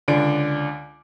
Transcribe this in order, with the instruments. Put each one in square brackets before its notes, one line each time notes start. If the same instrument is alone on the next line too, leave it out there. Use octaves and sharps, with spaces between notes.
[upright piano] C#2 D3 D4 D7